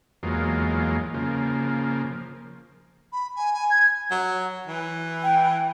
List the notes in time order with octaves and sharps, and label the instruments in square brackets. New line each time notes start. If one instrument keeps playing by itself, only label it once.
[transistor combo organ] E2 F#3 G#3 A#3 F4
C#3 F3 A#3
[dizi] B5
G#5
G#5
G#6
[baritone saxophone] F#3
E3
[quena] G5